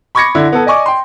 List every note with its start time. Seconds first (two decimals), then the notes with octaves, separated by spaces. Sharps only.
0.15 B5 C#6 D6 G#6 A#6 C#7
0.35 D3 E4
0.52 B3 A4
0.66 D5 D#5 G#5 C#6 D6
0.86 G5 C6